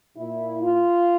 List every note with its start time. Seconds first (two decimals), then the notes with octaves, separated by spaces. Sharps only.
0.16 A#2 E4
0.63 F4